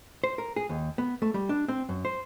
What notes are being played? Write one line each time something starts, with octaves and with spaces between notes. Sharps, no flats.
C5
A#4
G#4
D#2
B3
A3
G3
D4
C4
F#2
C5